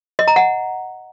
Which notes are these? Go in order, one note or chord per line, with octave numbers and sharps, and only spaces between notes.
D#5
A#5
F#5